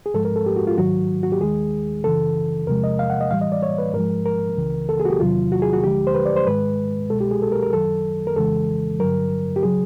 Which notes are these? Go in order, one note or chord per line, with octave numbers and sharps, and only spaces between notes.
G#4
G#2 F3 G#3 A4
A#4
A4
G4
F#4
F4
G#2 D#3 F#3 F#4
F#4
G4
D#2 D#3 G#3 G#4
F#2 C#3 E3 A4
E2 C3 F3 G#3 A#4
D#5
F5
F#5
D#5
A2 E3 G3 F5
D#5
D5
C#5
B4
G#2 F3 G#3 A#4
A#4
C#2 C#3 E3
A4
G#4
F#4
G4
E2 C3 D#3 F#3 F4
F#4
G#4
F#4
D2 D3 F3 G#3 G4
C5
B4
D5
C5
G#2 D#3 G#3 B4
C2 B2 G#3 A4
G4
G#4
A4
A#4
A#4
F#2 D#3 F#3 A4
A#4
F2 C#3 E3 G#3 A4
G2 D3 F#3 A#4
G4
C#3 F#3 G#4